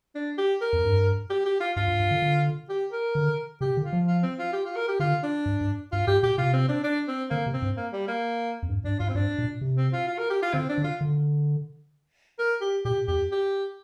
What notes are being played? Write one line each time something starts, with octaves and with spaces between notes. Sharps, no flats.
D4
G4
A#4
F2
G2
G4
G4
F4
G2 F4
G2
G2
D3
D3
G4
A#4
D3
C3 G4
D3
F4
F3
F4
C4
F4
G4
F4
A#4
G4
D3 F4
D4
G2
G2
G2 F4
G2 G4
A#2 G4
C3 F4
C4
D4
D4
C4
D3 A#3
C3
C4
G2
A#3
G3
A#3
F2
G2
G2 D4
G2 F4
C4
G2 D4
A#2
C3
C4
F4
F4
A#4
G4
F4
D3 C4
D4
D3
F4
D3
A#4
G4
A#2 G4
F2 G4
G4